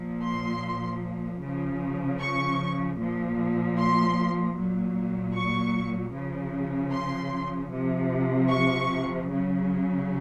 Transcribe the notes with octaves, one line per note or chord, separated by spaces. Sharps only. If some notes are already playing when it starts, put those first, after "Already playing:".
Already playing: A#2 F3
C6
C#3 F3
C#6
A#2 F3
C6
A#2 F#3
C#6
C#3 F3
C6
C3 F3
C#6
C#3 F#3